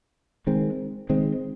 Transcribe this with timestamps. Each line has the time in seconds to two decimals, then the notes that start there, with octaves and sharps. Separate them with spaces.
0.47 D#3 G#3 C4
1.10 D#3 G#3 C4